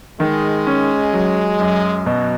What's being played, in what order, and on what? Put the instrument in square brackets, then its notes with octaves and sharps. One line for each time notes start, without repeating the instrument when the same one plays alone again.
[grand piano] D#3 [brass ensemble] G#3
[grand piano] C#4
F#3
F#2
[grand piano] B2 [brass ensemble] F#3